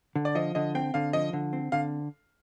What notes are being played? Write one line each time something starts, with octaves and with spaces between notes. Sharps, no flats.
D3
D5
F3 D#5
D3 D#5
C4 G5
D3 F5
F3 D#5
D3
C4
D3 F5